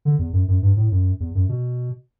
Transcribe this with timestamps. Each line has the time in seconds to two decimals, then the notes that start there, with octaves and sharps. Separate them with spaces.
0.05 D3
0.19 E2
0.33 F#2
0.48 F#2
0.62 G2
0.77 A2
0.92 F#2
1.20 E2
1.35 F#2
1.49 B2